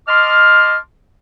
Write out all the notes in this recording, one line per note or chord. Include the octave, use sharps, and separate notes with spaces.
D#5 A5 C6 D6 F6